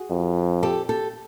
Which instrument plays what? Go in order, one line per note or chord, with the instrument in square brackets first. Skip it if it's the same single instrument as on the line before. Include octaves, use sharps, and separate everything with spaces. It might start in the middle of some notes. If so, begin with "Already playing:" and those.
Already playing: [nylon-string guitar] F#4 G#4
[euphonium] F2
[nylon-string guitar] G4 A4
G4 A4